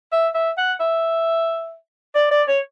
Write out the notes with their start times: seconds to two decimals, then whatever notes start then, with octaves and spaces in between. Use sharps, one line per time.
0.12 E5
0.35 E5
0.58 F#5
0.80 E5
2.15 D5
2.31 D5
2.48 C#5